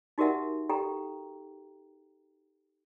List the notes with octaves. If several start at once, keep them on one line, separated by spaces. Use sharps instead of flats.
D#4 F#4 G4 A#4 E5 F#5
G4 A4 G5 A#5